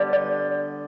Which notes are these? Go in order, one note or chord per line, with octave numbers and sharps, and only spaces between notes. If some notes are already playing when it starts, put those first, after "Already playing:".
Already playing: D3 G3 B3 D5
D5